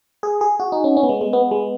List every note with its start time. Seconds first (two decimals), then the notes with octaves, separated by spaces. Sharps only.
0.23 G#4
0.41 G#4
0.60 F#4
0.72 D#4
0.84 C#4
0.97 C#4
1.03 B3
1.09 G#3
1.21 G#3
1.33 B3
1.51 G#3